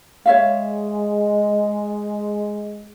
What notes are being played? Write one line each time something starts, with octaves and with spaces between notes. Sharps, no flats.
G#3 C#5 E5 F5